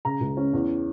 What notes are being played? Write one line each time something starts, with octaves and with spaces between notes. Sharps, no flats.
C#3 A#5
C#2
C#4
E2